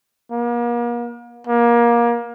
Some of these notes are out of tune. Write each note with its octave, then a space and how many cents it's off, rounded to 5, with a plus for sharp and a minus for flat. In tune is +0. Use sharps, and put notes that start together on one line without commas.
A#3 +40
A#3 +25